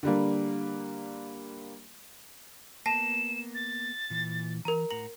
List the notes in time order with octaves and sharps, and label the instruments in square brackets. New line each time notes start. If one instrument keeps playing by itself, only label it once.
[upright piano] D3 G3 A#3
[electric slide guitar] A#3 B3 [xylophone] A5 A#6 C7 [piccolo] E7
[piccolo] A6
[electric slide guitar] A#2 E3
[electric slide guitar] E3 [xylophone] A#4 A#5
[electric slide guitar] A2 F#5 A#5 [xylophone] F#7